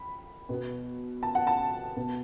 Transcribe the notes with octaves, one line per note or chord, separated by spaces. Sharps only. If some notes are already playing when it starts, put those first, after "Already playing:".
Already playing: B5
B2 B3
A5
F#5
A5
B2 B3